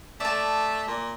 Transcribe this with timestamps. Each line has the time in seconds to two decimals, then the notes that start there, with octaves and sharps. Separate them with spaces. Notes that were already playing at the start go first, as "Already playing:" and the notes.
0.20 A3 D5 A5
0.88 A#2